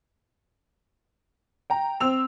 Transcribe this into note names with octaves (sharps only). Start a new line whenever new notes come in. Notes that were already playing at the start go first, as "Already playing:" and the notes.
G5 A#5
C4 E6 F7